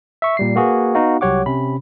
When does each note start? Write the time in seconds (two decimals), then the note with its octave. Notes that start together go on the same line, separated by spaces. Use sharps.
0.22 E5 C#6
0.37 A#2 G3 C7
0.56 A#3 F#4 G#4 B4
0.95 B3 D#4 F#4 F5
1.21 C2 F#3 G4 C#5 F#5 D6
1.46 C3 C#4 B5